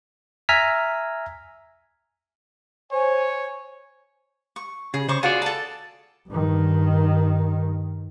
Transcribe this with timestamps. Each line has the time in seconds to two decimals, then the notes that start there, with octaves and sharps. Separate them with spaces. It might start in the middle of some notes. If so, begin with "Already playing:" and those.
0.49 E5 G#5 A#5 F6 B6
2.92 C5 C#5 G#5
4.56 C#6
4.94 C#3 G#4
5.08 C#3 C5 C#6 D6
5.23 F4 F#4 G#4 C#5 D5
5.42 A4 A5
6.29 G2 D#3